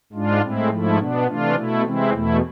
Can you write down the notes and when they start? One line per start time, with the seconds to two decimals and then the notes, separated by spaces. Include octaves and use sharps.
0.13 G#2 G#3 D4 F4
0.42 A2 G#3 C4 E4
0.70 G#2 F3 A3 E4
0.99 B2 B3 D4
1.27 C3 E3 A3 D4 F4
1.55 B2 A3 E4
1.84 C3 E3 G#3 C4 E4
2.12 E2 B2 A3 E4